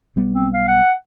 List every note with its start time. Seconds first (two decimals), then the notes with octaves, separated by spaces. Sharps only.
0.16 B1 G3 B3
0.34 C4
0.54 F5
0.68 F#5